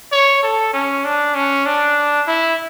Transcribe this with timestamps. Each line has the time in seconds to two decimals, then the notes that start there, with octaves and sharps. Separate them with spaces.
0.12 C#5
0.43 A4
0.74 C#4
1.05 D4
1.35 C#4
1.66 D4
2.27 E4